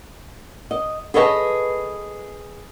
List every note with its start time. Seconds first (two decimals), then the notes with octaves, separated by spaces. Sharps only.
0.71 D#5
1.14 G#4 A4 B4 C#5 D#5 A5